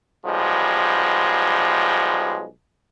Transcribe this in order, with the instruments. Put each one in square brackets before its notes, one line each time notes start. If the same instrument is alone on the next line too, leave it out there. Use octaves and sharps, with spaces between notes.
[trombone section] B1 F3 G3 G#3